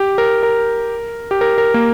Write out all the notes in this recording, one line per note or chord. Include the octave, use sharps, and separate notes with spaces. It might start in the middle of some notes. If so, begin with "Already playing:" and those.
Already playing: G4
A#4
A#4
G4
A#4
A#4
A#3